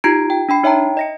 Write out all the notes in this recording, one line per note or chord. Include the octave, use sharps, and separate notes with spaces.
D#4 F4 G4 A#5 G#6 D7
G5
D4 G5 B5 C7
D#4 C#5 E5 G5 A5 A#5
D#5 A#6 C#7